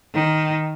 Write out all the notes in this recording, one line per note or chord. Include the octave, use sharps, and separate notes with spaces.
D#3